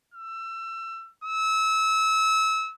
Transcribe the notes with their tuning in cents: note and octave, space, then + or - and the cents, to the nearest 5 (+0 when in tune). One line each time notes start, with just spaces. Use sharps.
E6 +30
E6 -25